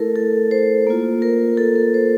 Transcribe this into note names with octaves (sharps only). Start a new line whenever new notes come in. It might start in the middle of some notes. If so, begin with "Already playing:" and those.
Already playing: A3 E4 A4 A#4
A4
C5
A#3 F4
A#4
A4
A#4
C5